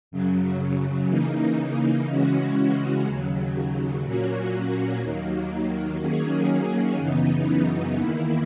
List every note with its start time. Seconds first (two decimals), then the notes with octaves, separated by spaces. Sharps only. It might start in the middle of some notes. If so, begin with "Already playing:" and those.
0.11 F#2 C#3 F#3
1.09 C#3 E3 A#3 D#4
2.08 C#3 E3 G#3 C#4 F#4
3.06 D#2 C#3 F#3
4.04 A#2 F#3 A#3 C#4 F#4
5.02 D#2 D#3 F#3 A#3
6.00 D#3 F#3 A#3 C#4 G#4
6.98 F#2 C#3 E3 B3 D#4
7.96 E2 D#3 A#3 E4